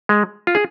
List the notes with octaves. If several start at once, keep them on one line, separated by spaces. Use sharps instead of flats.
G#3
F4
G#4